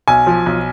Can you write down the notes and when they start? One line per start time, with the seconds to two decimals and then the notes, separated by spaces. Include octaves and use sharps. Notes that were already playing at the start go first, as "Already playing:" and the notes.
0.08 B1 G#5
0.27 F3
0.46 B1